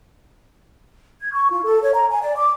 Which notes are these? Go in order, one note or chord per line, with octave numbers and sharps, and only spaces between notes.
G#6
C#6
F4
A4
C#5
A#5
G#5
D5
D6